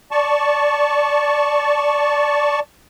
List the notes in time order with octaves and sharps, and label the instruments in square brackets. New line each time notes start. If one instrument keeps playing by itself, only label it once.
[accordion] D5 A5 C#6